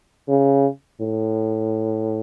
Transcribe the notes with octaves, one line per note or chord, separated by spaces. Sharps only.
C#3
A2